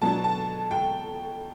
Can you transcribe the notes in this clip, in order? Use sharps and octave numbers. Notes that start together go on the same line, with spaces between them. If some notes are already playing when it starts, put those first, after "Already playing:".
B2 F#3 B3 D4 A5
A5
G5